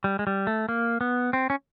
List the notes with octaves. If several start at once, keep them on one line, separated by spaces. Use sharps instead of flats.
G3
G#3
G3
A3
A#3
B3
C4
C#4